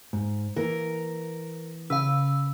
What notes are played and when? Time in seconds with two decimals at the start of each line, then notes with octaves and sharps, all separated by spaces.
0.13 G#2
0.56 E3 A#3 A#4
1.90 C#3 B4 F5 E6